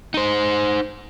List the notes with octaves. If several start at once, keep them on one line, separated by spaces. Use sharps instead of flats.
D#4 C5